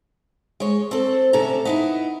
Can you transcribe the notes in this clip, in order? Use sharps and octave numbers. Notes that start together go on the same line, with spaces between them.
G#3 C#5
C4 A4
D2 C3 C#4 A4 A#5
B3 D#4 E4